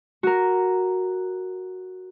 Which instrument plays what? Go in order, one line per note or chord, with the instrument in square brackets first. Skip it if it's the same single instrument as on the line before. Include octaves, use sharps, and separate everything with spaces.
[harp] F#4 A#4